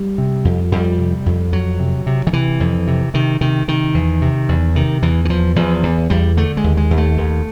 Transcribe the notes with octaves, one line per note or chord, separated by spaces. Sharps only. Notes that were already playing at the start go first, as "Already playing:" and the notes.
Already playing: G3
C3
F2
F2 G3
C3
F2
F2 F#3
C3
C3
D#3
C3 E3
F2
C3
C3 D#3
C3 D#3
C3 D#3
E2
C3
E2
C3 D#3
E2 E3
E3
E2 F3
E2 F3
E2
E2 G3
D3 A3
G#3
D#2
G#3
D#2
A3
D#2